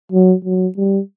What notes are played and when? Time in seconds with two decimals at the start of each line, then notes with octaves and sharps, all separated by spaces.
0.12 F#3
0.44 F#3
0.77 G3